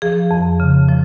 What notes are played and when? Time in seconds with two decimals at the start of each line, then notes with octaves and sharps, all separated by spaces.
0.02 F3 G#4
0.31 F2
0.60 C#3
0.88 F3